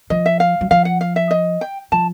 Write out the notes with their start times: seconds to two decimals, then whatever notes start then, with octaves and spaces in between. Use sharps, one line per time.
0.10 F3 D#5
0.26 E5
0.40 F5
0.61 F#3
0.71 F3 F5
0.85 F#5
1.01 F5
1.16 E5
1.31 D#5
1.61 G5
1.92 F3 A5